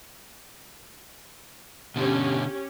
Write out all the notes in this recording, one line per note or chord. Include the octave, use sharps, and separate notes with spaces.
B2 D3 C#4 G4